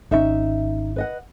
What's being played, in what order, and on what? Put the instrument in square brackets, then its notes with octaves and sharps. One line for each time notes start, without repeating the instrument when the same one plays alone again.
[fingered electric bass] G#1 D3 C#4 [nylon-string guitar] D#4 E5
[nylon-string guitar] B4 D#5 F#5